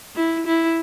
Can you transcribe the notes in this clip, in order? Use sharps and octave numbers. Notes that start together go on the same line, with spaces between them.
E4
E4